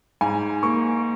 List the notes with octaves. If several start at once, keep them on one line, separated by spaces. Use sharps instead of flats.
G#2 G#5
A#3 C#6